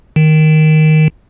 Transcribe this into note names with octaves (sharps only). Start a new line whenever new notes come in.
D#3